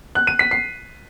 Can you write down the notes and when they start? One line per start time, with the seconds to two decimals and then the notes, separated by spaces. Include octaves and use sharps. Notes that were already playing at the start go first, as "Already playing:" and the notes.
0.15 F#6
0.27 D#7
0.39 B6
0.51 C7